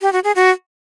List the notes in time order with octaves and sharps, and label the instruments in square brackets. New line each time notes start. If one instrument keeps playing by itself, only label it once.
[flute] G4
F#4
G#4
F#4